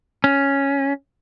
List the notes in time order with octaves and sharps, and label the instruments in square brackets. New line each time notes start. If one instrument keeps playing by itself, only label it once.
[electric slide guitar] C#4